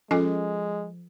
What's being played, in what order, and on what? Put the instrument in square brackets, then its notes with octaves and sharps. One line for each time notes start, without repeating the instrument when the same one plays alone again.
[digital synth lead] F3 [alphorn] G#3 [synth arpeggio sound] C#4 [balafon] F4 A4 D#5